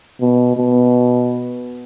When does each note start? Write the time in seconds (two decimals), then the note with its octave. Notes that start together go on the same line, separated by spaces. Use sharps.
0.21 B2
0.57 B2